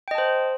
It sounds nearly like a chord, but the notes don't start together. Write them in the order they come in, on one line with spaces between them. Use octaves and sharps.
G5 D#5 A5 C5